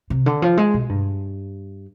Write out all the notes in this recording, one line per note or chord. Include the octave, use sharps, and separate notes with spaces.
C3
D3
F3
G#3
B2
G2